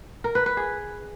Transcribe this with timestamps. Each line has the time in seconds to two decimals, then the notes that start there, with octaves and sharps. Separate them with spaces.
0.24 A#4
0.35 B4
0.46 B4
0.57 G#4